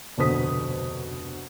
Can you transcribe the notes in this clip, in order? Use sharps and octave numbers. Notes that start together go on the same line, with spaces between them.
F1 D2 B2 C5 D#6 B6